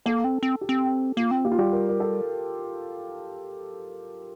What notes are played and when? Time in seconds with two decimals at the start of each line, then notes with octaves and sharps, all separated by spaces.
0.06 A#3 A4
0.24 C4
0.43 C4
0.61 G4
0.69 C4
1.17 A#3 F4
1.31 C4
1.45 A#3 G4
1.52 F4
1.58 G3 G4
1.73 A#4
1.89 A#4
2.00 A4